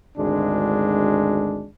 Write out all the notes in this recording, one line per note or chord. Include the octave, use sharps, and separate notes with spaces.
G#1 D2 G#3 D4